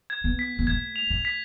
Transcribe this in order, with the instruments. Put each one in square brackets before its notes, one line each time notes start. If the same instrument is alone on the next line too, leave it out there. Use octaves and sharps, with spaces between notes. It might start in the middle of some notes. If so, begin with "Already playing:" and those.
[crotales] G#6
[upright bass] B3
[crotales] B6
[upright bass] B3
[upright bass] A3 [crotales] G#6
[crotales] F7
[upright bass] A3
[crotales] B6